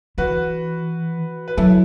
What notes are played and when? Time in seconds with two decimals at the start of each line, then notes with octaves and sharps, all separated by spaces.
0.18 E3 F#4 B4
1.48 B4
1.57 F#3 E4 A4